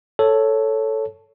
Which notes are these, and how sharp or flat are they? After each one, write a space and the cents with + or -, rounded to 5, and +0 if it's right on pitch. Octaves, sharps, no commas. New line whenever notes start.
A4 +0 C#5 +0